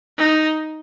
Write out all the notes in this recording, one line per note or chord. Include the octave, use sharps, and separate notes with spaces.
D#4